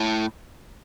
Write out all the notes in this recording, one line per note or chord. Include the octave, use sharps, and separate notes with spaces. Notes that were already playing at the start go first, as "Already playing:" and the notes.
Already playing: A2